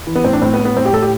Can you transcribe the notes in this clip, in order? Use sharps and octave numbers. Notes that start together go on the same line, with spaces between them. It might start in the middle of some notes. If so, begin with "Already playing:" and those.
E3
B3
A2 C4
D4
A2 C4
B3
A2
B3
A2 C4
G4
A2 A4
G4